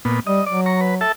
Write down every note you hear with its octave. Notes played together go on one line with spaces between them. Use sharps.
A#2 B3
G3 D#5
F#3 D5
A#5 C#6
B4
A4 E5 A5